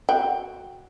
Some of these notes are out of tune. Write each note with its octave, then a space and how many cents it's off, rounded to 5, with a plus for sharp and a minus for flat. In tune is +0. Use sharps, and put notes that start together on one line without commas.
F#4 +0 G5 +5